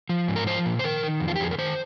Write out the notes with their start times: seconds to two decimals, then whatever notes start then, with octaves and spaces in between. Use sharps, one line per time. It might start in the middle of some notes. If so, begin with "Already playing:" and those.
0.09 F3
0.28 G#2
0.36 A#4
0.46 F3 C5
0.66 A#2
0.79 C5
0.84 D#3 A#4
1.03 D#3
1.20 F2
1.28 F4
1.36 G4
1.40 F2 G#4
1.51 A#4
1.58 D#3 C5